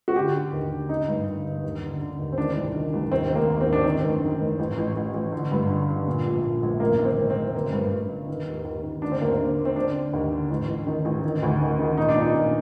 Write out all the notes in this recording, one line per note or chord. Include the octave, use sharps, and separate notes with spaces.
F#4
D3 G4
D3
D#2
D3
D3 D#4
G2
D3
G1
D#2
D3
D3
D#2
C4
D#3 D4
C2
D#3
C2
D#2 C4
D#3
A#3
D#2
C4
D#2
D4
D#3 C4
F#1
D#3
F#1
A1
A1
A1
A1
D3
G2
D3
D3
A#2
A#1
A#2
A#1
F#1 A#3
D#3
C4
F#1
C4
F#1
G1 A#3
G2
G2
G1
D#3
D#2
D#2
D#3
D3 D4
C4
D#2 A#3
C4
D3
D3
C4
D3 D4
D3
D#2
D3
A1
A1
D#3
A1
D#3
D2
D#3
D#3
A#2 D#4
D4
A#2 D#4
A#2